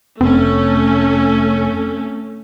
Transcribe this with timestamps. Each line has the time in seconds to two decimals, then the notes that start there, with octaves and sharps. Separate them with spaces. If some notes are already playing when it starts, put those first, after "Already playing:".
0.21 F1 A3 C4 C#4 A4